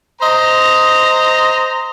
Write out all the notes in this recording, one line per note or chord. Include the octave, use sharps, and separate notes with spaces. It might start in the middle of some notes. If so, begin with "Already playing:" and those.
C5 D#5 A#5